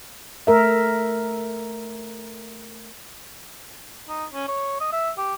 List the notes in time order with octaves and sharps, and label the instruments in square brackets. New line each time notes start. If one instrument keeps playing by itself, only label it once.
[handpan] A3 A#4 E5
[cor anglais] D#4
C#4
C#5
D#5
E5
G4